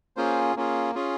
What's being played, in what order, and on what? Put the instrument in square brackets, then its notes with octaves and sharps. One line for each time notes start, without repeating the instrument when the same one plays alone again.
[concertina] A#3 C#4 F4 G#4 C5
A#3 C#4 F4 G#4
C#4 F4 G#4